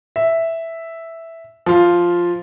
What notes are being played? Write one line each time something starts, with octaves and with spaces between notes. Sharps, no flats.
E5
F3 F4